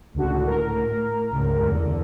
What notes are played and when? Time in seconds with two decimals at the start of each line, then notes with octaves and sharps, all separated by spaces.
0.14 C#2 A2 D3 F#4
0.47 A#4
1.32 C#2 G2
1.62 E2 D3